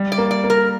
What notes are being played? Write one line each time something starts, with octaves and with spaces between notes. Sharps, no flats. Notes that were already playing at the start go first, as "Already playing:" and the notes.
Already playing: G3
D5
A#3
D5
A#3
A#4